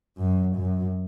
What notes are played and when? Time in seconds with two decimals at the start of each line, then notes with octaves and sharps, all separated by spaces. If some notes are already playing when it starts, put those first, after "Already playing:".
0.18 F#2
0.56 F#2